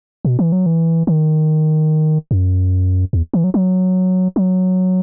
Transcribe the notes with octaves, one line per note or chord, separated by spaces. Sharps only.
B2
E3
F#3
E3
D#3
F#2
E2
E3
F#3
F#3
F#3